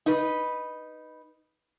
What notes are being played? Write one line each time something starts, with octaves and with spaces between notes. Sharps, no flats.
D#4 B4